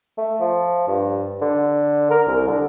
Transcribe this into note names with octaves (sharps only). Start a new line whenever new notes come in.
A3
F3
G2
D3
A#4
C2
D3